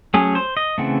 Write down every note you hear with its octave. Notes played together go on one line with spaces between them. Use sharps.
F#3 A3 C#4 G#4
C5
D#5
C#3 E3 A3 C4 F#5